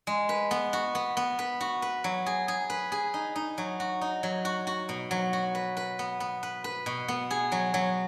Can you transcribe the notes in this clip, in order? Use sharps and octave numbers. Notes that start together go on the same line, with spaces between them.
G#3
B4
B3
F#4
B3
B3
B4
F#4
B4
F#3
G#4
G#4
B4
G#4
D#4
D#4
F#3
F#4
D#4
F#3
F#4
F#4
B2
F#3
F#4
B4
B4
B3
B3
B4
B4
B2
B3
G#4
F#3
F#3